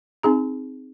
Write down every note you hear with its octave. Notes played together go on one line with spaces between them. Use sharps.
C4 D#4 G#4 A#5